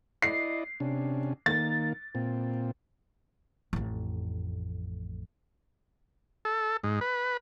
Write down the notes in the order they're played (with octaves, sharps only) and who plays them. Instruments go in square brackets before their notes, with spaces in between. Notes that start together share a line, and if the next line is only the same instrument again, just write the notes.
[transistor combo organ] E4 D5 D#5 [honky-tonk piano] C7
[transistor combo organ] C3 C#4 D4
[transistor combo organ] D#3 A#3 [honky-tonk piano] A6
[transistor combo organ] A#2 C4
[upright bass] A1 F2
[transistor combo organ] A4
G#2
B4